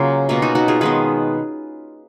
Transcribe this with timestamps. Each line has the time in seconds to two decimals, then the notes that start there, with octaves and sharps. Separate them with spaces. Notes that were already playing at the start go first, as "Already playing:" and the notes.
Already playing: C#3 F#3 A#3 C#4 F4 A#4 C#5
0.29 B2 A#3 C#4 F4
0.42 D#4 F#4
0.55 D#4 F#4
0.68 F4 G#4
0.81 D#3 G#3 B3 G#4 B4